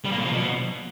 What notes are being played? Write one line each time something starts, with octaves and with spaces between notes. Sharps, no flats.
G3
A#3
A#2
F3
B2